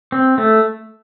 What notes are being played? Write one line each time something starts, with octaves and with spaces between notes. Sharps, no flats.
C4
A3